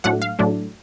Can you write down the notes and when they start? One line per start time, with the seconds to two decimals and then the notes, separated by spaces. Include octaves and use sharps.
0.04 A2 F#3 A3 D4 F#5
0.22 F5
0.39 A2 F#3 A3 D4